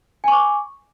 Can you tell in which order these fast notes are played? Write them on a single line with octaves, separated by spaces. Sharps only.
G#5 C#6 D6